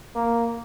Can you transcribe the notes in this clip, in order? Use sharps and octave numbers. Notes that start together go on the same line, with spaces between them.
A#3